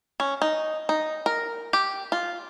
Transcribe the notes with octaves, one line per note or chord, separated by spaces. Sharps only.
C#4
D#4
D#4
A#4
G4
F4